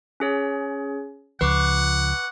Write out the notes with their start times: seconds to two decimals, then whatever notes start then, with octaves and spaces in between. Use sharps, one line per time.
0.20 C#4 G#4 C#5
1.41 C#2 F3 B4 F#5 C#6 D6